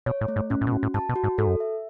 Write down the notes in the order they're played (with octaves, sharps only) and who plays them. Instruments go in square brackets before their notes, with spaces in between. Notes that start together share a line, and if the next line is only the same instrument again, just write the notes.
[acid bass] B2 [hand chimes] C#5
[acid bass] A2
[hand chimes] A3
[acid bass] G#2
[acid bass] A2 [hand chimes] C#4
[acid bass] A2
B2
[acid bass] A2 [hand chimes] F#4
[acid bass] A2
[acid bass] G#2 [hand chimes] A5
[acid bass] B2
[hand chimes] F#4
[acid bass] G#2
[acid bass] G#2 [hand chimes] A4
[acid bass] F#2
[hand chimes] E5